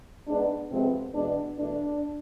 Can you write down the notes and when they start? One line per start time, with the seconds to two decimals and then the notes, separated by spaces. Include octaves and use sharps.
0.27 G#2 G#3 B3 D4
0.70 F2 C3 F3 G#3 B3 C4
1.13 E2 B2 G#3 B3 D4
1.56 E2 B2 A3 D4